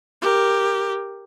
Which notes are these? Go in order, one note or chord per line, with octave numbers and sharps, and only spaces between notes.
G4 A#4